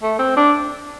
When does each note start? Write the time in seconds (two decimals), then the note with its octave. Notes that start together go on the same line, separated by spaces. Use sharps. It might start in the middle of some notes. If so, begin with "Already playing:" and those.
0.02 A3
0.19 C4
0.36 D4